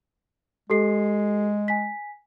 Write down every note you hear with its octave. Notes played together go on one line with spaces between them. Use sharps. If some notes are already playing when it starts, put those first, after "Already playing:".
G#3 G4 A4 C7
G#5 B6